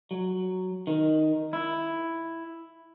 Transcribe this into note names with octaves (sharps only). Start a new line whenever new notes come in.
F#3
D#3
E4